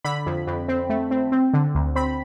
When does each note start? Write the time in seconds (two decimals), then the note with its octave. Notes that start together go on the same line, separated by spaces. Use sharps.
0.05 D3 B5
0.26 F2
0.47 F2
0.68 C4
0.90 A3
1.11 C4
1.32 C4
1.54 D3
1.75 D2
1.96 C4 B5